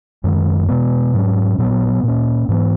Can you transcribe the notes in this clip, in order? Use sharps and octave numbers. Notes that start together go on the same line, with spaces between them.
F#2 D#3 G#3
B2 G#3 B3
G#2 F#3 C#4
A#2 F#3 B3
A#2 A#3 C#4
G#2 E3 B3